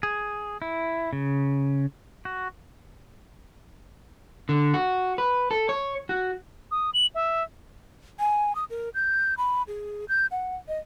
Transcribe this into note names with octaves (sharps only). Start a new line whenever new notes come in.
G#4
E4
C#3
F#4
D3
F#4
B4
A4
C#5
F#4
D#6
F#7
E5
G#5
D#6
A#4
G6
B5
G#4
G6
F#5
D#5